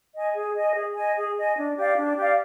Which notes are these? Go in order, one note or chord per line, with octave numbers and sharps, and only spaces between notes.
D#5 G#5
G#4
D#5 G#5
G#4
D#5 G#5
G#4
D#5 G#5
D4
G4 D5 F5
D4
G4 D5 F5